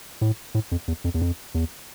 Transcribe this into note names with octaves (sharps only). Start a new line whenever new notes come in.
A2
A2
F2
E2
F2
E2
F2
E2